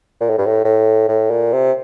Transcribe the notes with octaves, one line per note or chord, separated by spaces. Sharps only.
A#2
A2
G2
A2
A2
A2
A#2
C3